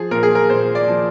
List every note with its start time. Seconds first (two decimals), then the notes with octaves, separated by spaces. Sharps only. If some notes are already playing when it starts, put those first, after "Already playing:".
Already playing: F3 G#4
0.11 A#2 A#4
0.23 G#4
0.35 A#4
0.50 A#2 C5
0.75 D5
0.88 F3